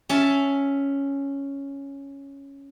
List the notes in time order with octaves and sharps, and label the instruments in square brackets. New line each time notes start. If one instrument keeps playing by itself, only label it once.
[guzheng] C#4 E5 A5